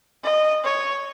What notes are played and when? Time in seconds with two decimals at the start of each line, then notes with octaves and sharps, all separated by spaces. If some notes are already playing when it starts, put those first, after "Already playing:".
0.24 D#5
0.64 C#5